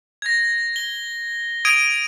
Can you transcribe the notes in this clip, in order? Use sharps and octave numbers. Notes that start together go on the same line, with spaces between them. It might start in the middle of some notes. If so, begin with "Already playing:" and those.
G#6 A#6
G7
D#6 G#6 D7 D#7